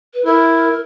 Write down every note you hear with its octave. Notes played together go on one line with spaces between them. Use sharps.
B4
E4 A#4